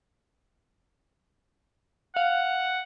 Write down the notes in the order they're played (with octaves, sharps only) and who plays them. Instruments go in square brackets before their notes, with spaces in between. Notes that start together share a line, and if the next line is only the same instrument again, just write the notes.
[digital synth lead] F5 [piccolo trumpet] F#5